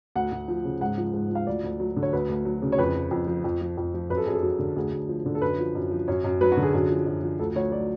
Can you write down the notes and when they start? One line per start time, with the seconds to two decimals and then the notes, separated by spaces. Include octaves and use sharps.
0.15 D2 F#5
0.32 D2
0.48 F3
0.65 C#3
0.81 G#2 F#5
0.98 F3
1.14 G#2
1.30 F3
1.35 F5
1.47 D2 D5
1.64 D2
1.80 F#3
1.96 D3
2.03 C#5
2.13 D2 B4
2.29 D2
2.45 F#3
2.62 C#3
2.72 C#5
2.78 F2 B4
2.95 F3
3.11 F2
3.27 F3
3.44 F2
3.61 F3
3.77 F2
3.94 F3
4.10 F#2 B4
4.17 A4
4.26 F#2 G#4
4.33 A4
4.43 F#3
4.59 D3
4.76 D2 G#4
4.92 D2
5.09 F3
5.26 D3
5.35 A4
5.41 F#2 B4
5.58 F3
5.75 F#2
5.91 F3
6.08 F#2 C#5
6.24 F#2
6.41 F#3 B4
6.52 F#4
6.57 D3
6.63 G#4
6.74 F#2 G#4
6.90 F3
7.06 F#2
7.23 F3
7.39 D2 A4
7.55 D2 C#5
7.72 F#3 D5